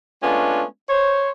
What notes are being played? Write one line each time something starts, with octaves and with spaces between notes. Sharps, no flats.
G#3 A3 B3 C#4 D4 F4
C5 C#5